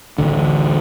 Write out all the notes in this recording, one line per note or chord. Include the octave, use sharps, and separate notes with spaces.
A1 D2 D3